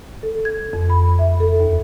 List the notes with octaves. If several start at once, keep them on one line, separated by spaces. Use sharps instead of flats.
A4
G#6
F2
B5
E5
A4
D#2